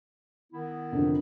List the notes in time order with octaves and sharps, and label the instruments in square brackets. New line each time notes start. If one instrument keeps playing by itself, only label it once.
[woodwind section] D#3 B3 E4
[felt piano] F1 D3 F3